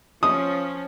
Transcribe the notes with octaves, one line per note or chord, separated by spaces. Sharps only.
F3 C#4 D#6